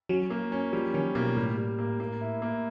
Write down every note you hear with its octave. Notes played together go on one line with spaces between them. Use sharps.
F#3 C#4
A#3
C#4
F3 G3
D#3 C#4
B2 A#3
A2 G3
G3
A#3
A#3
E4
A#3